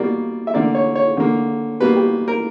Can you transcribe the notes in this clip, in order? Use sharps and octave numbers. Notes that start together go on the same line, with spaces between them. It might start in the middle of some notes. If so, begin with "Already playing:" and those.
Already playing: B2 G3 A#3 D5
E5
D3 A#3 D5
C#5
C#5
D3 A#3
B2 G3 A#3 B4
G4
A#4